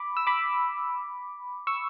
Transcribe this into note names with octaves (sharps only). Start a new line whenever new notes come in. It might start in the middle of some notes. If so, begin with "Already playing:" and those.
Already playing: B5 D6
E6
B5 D6
C#6 E6